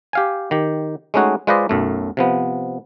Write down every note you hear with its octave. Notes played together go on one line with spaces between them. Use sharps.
G4 F5 G#5
D#3 G4
G#3 A3 C#4 D#4 F#4 G#4
G#3 F4 B4 C5 D5 D#5
B1 F#2 A3
C3 F3 B3